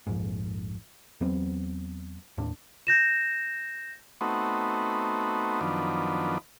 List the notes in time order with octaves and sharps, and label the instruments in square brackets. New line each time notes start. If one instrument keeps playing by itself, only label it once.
[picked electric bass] A#1 F2 G#2
E2 F#3 B3 C4
D#2 A2 D4
[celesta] G6 A#6 E7
[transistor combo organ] A3 B3 C4 D#4 F#4
F#2 D#3 F3 B3 D4